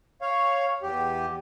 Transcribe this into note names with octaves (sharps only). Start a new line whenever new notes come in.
C#5 F5
E2 G4